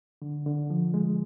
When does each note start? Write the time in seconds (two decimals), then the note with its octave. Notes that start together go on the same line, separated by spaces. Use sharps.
0.22 D3
0.46 D3
0.70 F3
0.94 G#3